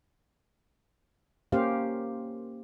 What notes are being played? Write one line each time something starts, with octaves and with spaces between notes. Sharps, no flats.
A#3 C#4 G4 C5 F5